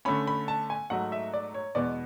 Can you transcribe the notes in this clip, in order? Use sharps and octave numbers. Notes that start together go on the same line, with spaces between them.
D3 A3 C#4 B5
B5
A5
G#5
G#2 F#3 A3 F#5
E5
D5
C#5
E2 B2 G#3 B3 D5